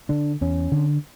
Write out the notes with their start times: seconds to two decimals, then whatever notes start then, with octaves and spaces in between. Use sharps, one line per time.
0.09 D3 D4
0.41 E2 C#4
0.72 D3